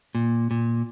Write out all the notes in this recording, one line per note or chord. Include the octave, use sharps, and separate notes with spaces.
A#2
A#2